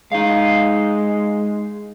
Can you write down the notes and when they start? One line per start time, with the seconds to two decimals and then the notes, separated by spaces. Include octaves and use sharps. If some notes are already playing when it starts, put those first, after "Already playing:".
0.12 G#3 D#4 F5